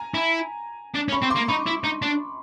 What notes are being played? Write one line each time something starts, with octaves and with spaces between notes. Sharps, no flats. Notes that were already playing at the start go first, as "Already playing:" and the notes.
Already playing: G#5 A#5
E4
D4
C#4
B5 C#6
C4
A#3 C6 D6
D#4 B5 C#6
E4
D#4
D4